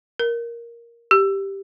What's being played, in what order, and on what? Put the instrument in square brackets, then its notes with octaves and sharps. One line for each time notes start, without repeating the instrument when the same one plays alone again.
[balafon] A#4
G4